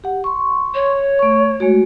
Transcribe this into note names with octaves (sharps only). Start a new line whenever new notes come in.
G4 F#5
C6 C#6
C#5
A3 C#6
G#3 A3 F#4